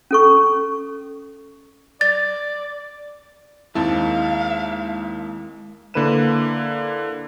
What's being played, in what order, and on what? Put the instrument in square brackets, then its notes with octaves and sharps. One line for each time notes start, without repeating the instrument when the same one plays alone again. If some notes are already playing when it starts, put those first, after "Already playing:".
[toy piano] C#4 A4 C#6
[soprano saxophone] D5 [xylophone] A6
[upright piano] D#2 C4 A5 [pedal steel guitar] G#3 A#3 [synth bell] E4 [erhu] F5
[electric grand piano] D3 A#3 E4 B4 D#7 E7